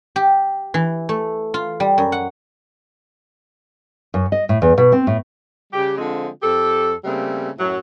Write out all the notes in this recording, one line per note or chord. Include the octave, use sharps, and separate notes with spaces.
G4
E3
A3
F4
G3
F#2
F#5
F#2
D#5
A2
E2
B2
C4
A2
C#3 G3 G4
D3 F3 G#3 C4 F4
F2 G4 A4
C#3 G3 A3 A#3 C4
F#2 A2 F#3